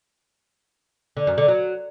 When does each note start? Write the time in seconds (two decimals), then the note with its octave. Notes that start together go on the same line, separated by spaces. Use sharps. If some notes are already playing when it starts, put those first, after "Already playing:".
1.17 D3
1.27 F#2
1.38 D3
1.48 F#3